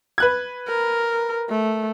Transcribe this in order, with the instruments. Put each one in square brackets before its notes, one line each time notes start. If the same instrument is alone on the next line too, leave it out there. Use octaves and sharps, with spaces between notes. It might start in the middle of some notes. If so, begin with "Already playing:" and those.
[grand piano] B4 F#6 G#6
[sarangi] A#4
A3